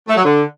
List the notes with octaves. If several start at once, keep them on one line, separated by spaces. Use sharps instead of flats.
A3
F#3
D3